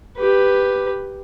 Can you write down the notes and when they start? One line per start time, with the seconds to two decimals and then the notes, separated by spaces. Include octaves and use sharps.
0.17 G4 B4